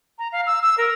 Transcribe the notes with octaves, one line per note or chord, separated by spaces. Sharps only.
A#5
F5
E6
E6
A#4